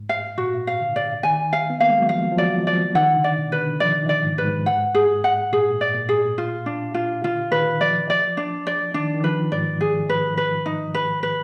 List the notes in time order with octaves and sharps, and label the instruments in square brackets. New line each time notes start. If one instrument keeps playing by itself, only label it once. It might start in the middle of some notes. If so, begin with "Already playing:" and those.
Already playing: [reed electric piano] G#2
[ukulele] F5
[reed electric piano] A#2 [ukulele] F#4
[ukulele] F5
[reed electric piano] D3
[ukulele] D5
[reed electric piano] D#3 [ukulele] G#5
[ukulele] F5
[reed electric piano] B3
[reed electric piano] A#3 [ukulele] F5
[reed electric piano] G#3
F#3
[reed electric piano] F3 [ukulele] F5
[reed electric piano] F3
[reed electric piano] F#3 [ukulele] D5
[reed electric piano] F3 [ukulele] D5
[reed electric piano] D#3 [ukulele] F#5
[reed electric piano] D3
[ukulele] D5
[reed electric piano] B2
[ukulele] B4
[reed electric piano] D3
[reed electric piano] F3 [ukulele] D5
[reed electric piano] D#3
[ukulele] D5
[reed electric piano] G#2
[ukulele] B4
[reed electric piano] G#2
[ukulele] F#5
G#4
F#5
[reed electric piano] A#2 [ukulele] G#4
[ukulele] D5
[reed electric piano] A#2
[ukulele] G#4
F4
D4
F4
[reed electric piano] D3 [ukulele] F4
[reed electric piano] D#3 [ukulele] B4
[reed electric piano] F3 [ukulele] D5
[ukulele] D5
D4
D5
[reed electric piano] D#3 [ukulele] D4
[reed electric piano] D#3
[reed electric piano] F3 [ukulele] B4
[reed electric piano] G#2 [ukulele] D5
[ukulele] G#4
B4
B4
D#4
B4
B4